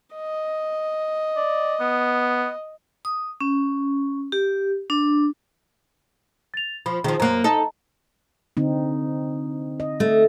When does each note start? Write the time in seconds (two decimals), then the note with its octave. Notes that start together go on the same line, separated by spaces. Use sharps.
0.15 D#5
1.37 D5
1.80 B3
3.05 D#6
3.41 C#4
4.32 G4
4.90 D4
6.54 A6 F7
6.86 F3 B5
7.04 D#3 F3 G#4
7.20 F#2 A#3 A#5 F#6
7.44 D#4 A4 D#5 A5 A#5
8.57 D3 C4 D#4
9.80 D#5
10.00 A3